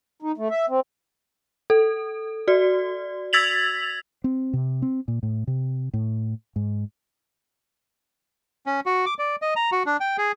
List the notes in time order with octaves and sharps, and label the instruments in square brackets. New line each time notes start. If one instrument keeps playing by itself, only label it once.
[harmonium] D#4
A3
E5
C4
[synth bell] A4
F#4 D5
E6 G#6 A6 B6 F7 F#7
[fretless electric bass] C4
C3
C4
A#2
A2
C3
A2
G#2
[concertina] C#4
F#4
D6
D5
D#5
A#5
F#4
D4
G5
G#4